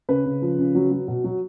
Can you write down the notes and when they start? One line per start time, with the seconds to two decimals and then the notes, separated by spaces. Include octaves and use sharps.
0.09 C#3 B4
0.26 C#3
0.42 F3
0.59 C#3
0.75 F#3
0.91 F#3
1.08 B2
1.24 F#3